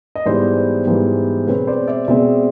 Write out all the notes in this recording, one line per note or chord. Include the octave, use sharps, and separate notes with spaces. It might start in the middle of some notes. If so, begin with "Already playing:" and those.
D#5
G#2 E3 G3 B3 C5 D5
G#2 E3 G3 B3
B2 G#3 C4 B4 C#5
C5 D5
D5 E5
B2 G#3 C4 D5 E5